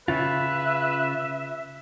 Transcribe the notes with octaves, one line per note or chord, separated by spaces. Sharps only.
C#3 F4 B4 E5